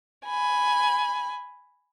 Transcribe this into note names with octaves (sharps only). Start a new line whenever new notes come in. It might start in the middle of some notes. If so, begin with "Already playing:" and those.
G#5 B5